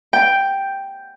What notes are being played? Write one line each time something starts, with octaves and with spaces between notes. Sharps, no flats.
G5